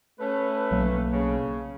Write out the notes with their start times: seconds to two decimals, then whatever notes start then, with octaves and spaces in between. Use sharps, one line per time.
0.19 A3 C#4 B4
0.71 B1 F#3 A#3
1.11 C#3